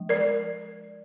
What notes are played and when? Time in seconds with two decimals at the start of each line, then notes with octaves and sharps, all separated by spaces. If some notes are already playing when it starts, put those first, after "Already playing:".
Already playing: F3 G#3 D4
0.09 A#4 D5